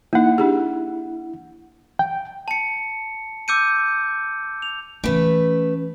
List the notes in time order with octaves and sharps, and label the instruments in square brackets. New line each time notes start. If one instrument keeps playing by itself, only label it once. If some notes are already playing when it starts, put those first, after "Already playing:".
[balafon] A#3 D#4 [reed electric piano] E4 F#5
[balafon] D4 G4 G#4
[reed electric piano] G5
[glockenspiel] A5 C#7
D6 E6 G6 C#7 D#7
F7
[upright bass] E3 C#4 [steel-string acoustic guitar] A3 B4